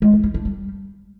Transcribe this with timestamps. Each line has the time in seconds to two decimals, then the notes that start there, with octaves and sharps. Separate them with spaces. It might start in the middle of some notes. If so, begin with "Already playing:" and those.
0.02 G#3
0.13 E3
0.24 D#4
0.34 D4
0.45 G3